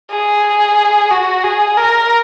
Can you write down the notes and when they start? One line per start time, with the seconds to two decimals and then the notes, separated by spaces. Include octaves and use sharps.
0.11 G#4
1.11 F#4
1.44 G#4
1.77 A#4